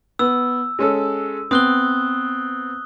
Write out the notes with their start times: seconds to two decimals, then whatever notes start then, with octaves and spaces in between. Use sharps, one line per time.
0.19 B3 E6
0.79 G#3 C#4 A4
1.51 B3 C4 D#6 F#6 G7